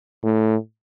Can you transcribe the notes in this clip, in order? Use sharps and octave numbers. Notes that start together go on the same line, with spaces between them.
A2